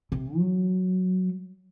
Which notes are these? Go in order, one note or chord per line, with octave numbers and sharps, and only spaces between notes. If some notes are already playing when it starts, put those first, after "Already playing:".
C3
F#3